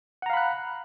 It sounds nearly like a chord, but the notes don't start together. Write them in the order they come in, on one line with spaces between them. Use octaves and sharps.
F#5 A#5 F5 B5 F#6